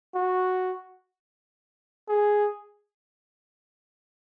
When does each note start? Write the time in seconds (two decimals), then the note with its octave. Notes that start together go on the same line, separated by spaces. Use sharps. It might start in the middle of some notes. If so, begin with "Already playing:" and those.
0.15 F#4
2.08 G#4